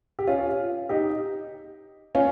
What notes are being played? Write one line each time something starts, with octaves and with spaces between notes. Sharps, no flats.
G4
C#4 F4
D#4 G4
C#4 F4